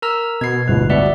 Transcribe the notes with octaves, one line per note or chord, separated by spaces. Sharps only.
A#4 A#5 E6
B2 G#6 C7
D1 G1 G#2 B4
B2 D5 E5 F#5